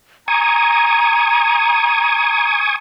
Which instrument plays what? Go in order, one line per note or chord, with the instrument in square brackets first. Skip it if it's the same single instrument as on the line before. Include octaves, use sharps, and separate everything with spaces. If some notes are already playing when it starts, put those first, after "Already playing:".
[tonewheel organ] G#5 C#6 D#6 [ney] A#5